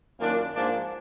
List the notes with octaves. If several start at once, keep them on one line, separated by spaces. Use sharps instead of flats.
F#2 D#3 A#3 D4 F4
G#2 F3 A#3 D4